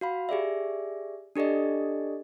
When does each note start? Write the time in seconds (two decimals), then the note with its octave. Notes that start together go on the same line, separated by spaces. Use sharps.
0.01 F#4 F5 B5
0.29 G4 G#4 D5 E5
1.36 D4 G4 A4 D5 D#5